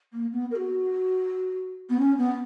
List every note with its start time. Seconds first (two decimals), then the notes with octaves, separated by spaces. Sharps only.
0.13 A#3
0.32 B3
0.50 A#4
0.55 F#4
1.89 B3
1.99 C#4
2.17 B3